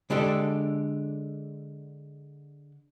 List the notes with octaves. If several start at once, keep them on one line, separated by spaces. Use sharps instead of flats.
D3 G#3 D4 G4 A4